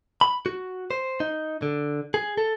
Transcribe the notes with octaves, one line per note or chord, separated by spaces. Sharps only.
B5
F#4
C5
D#4
D3
G#4
A4